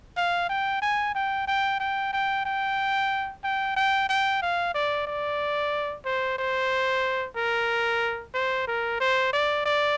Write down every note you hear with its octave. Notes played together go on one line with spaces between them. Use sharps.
F5
G5
G#5
G5
G5
G5
G5
G5
G5
G5
G5
F5
D5
D5
C5
C5
A#4
C5
A#4
C5
D5
D5